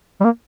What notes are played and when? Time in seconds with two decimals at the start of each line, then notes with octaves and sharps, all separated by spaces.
0.20 G3
0.24 A#3